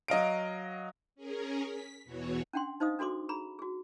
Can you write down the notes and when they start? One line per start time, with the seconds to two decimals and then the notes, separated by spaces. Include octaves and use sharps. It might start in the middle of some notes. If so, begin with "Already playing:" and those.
0.08 F#3 D#5 F5 D7
1.15 C#4 G#4 A#4
1.65 B6
2.04 E2 B2 E3 F#4 C#5
2.53 C#4 D4 F#5 G5 C6
2.80 D#4 C5 D#5 F5 D#6
2.99 D4 F#4 A4 C6 D6
3.29 G#4 A#5 B5
3.59 F#4 G#4